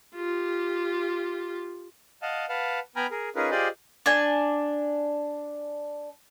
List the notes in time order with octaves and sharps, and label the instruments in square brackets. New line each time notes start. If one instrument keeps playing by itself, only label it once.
[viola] F4 G4
[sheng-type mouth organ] D#5 F5 F#5 A5
B4 F5 F#5 A5
B3 G5 G#5 A#5 B5 F6
G#4 A#4
C#4 D#4 F4 G#4 A#4 B4
F4 G4 G#4 C5 D5 D#5
[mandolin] D4 G#5